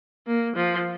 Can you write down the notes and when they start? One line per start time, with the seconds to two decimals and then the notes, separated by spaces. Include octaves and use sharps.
0.27 A#3
0.56 F3